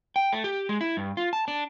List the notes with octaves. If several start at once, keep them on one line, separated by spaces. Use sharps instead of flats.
G5
A3
G4
G#3
E4
G2
F4
A5
D4